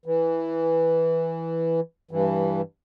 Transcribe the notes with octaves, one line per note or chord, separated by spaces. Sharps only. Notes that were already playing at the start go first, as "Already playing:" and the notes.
E3
G2 E3